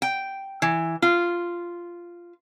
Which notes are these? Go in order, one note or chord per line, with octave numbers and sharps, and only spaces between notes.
G5
E3
F4